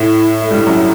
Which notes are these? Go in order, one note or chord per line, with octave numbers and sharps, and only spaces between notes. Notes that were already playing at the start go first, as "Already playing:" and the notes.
Already playing: A2 A3
A3
G2 G3
F#2 F#3